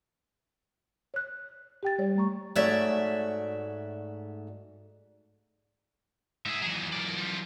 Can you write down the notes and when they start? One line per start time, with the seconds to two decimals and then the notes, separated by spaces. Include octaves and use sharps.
1.14 C#5 F#6
1.83 G4 G5 A6
1.99 G3 C#5 D5
2.15 G3 A3 A#5 C#6
2.56 G#2 A3 F#4 C#5 D5 E5
6.46 G#2 G#4 E5
6.62 D#2 E3 F#3 G#4
6.93 A#4 D5
7.17 G3 F4